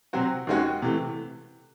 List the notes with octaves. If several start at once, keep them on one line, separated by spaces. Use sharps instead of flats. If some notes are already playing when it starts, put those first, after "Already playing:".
C3 F#3 C4 F#4
D#2 D#3 G#3 C#4 F#4
C3 E3 A3